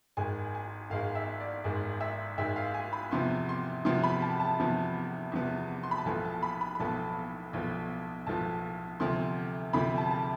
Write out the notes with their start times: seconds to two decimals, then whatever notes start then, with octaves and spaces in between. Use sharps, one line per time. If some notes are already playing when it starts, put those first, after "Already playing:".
0.17 G#1 G#2 G#3 G#5
0.55 G#5
0.90 G#1 G#2 G#3 F5
1.15 E5
1.40 D5
1.64 G#1 G#2 G#3
2.01 E5
2.37 G#1 G#2 G#3 E5
2.56 F5
2.74 G#5
2.93 B5
3.11 E2 C3 F3 B3 C6
3.49 C6
3.85 E2 C3 F3 B3 C6
4.04 B5
4.22 A5
4.40 A5
4.58 E2 C3 F3 B3
5.32 E2 C3 F3 B3
5.83 C6
5.91 B5
5.98 A5
6.05 B1 A2 F3 B3 G#5
6.25 A5
6.43 B5
6.61 B5
6.75 B5
6.80 B1 A2 F3 B3 A5
7.53 B1 A2 F3 B3
8.27 B1 A2 F3 B3 A5
9.00 D2 C3 F3 C6
9.73 D2 C3 F3 B5
9.98 A5
10.11 A5